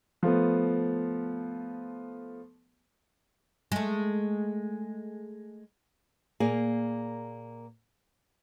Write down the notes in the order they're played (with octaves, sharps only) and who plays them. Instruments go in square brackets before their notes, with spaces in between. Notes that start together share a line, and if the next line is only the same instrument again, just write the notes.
[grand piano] F3 A3 B3
[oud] G#3 A3
[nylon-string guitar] A#2 A#3 G#4 A#4 F5 G#5